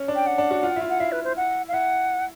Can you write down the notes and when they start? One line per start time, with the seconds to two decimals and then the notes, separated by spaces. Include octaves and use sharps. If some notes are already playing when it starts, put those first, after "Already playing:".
Already playing: C#4
0.08 D4
0.15 G5
0.26 F#5
0.38 D4
0.51 F#4
0.63 F4
0.76 E4
0.81 F4
0.90 F#5
1.00 E4 F5
1.12 B4
1.24 C5
1.37 F#5
1.68 F5
1.73 E4 F#5